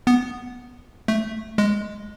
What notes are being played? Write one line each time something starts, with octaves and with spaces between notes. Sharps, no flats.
B3
A3
G#3